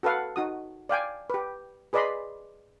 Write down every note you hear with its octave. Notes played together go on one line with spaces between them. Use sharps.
F#4 A4 B4 F5 F#5
D#4 F#4 D#6
D5 F5 G5 G#5
G4 B4
G#4 B4 D5 D#5 B5 C6